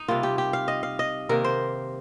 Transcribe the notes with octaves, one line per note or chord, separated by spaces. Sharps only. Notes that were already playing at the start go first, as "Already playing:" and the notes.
Already playing: D#4
C3 G3 A#3 F4
G4
G4
F5
D#5
F5
D#5
C3 D#3 A#3 A#4
C5